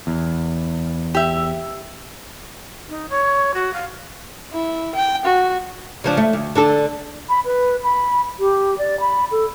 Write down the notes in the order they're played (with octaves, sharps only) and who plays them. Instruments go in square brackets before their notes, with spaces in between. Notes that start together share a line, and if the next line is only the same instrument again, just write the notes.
[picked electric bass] E2
[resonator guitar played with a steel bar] G4 E5
[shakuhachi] D#4
C#5
F#4
F5
[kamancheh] E4
G5
F#4
[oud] C#3 F3 D4
A3
D2
D3 D4 A4
[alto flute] B5
B4
B5
G4
D5
B5
A4